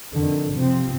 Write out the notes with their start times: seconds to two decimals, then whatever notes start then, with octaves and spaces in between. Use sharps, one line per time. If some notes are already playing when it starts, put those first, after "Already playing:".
0.16 F2 D3 D#3
0.54 C3 F3 C4